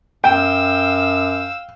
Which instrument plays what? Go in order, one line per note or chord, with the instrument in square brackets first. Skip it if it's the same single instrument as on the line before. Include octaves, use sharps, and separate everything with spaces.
[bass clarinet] F#2 [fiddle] F5 E6 [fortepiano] G5